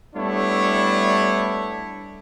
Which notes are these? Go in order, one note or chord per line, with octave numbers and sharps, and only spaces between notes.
G3 A3 B3 D4 E4 C#5